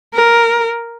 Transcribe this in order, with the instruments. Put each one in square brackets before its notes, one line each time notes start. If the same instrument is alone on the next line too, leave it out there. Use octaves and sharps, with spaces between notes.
[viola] A#4